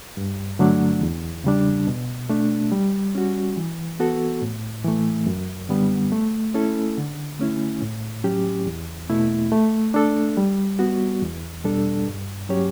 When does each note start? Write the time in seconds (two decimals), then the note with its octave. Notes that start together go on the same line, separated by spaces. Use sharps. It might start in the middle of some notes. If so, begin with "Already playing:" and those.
0.17 G2
0.59 D3 F#3 A3 D4
1.02 E2
1.44 C#3 G3 D4
1.87 B2
2.30 A3 D4
2.72 G3
3.15 C#4 F#4
3.57 E3
4.00 B3 F#4 A4
4.42 A2
4.85 E3 A3
5.27 F#2
5.69 D3 G3 B3
6.12 A3
6.54 C#4 E4 A4
6.97 D3
7.39 A3 C#4 E4
7.82 A2
8.24 F#3 C#4 G4
8.66 E2
9.10 B2 A3 E4
9.52 A3
9.94 D4 A4
10.37 G3
10.79 B3 F#4
11.22 E2
11.64 B2 G3 D4 A4
12.07 G2
12.49 F#3 C#4 G4 C#5